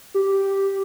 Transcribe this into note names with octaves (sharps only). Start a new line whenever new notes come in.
G4